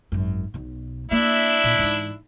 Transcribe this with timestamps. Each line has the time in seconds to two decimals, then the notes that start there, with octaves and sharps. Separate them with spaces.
0.12 G#1 F#2
0.54 B1 B2
1.11 A#3 D4 E4 E5
1.64 A#2
1.79 G#2 E3